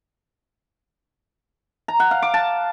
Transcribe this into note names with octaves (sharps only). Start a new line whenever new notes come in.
A#5
F#5
F5
D6
A5